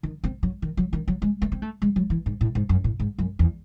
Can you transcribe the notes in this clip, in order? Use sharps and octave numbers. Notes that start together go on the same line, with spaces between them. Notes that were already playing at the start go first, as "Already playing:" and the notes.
D#3
C4
F#3
D#3
F#3
D#3
F#3
G#3
A3
C4
A3
G#3
F#3
E3
G#2
A2
G#2
F#2
A2
G#2
F#2
E2